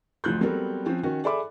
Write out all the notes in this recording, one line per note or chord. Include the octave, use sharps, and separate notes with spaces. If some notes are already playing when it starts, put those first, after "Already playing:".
A1 D2 F3 F#6 G6
F#3 G3 B3 C4 A4 A#4
F3 C4 C#4
D#3 C#4 F#4
G#4 A4 D5 E5 B5 D6